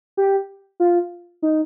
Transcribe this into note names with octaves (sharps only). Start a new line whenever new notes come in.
G4
F4
D#4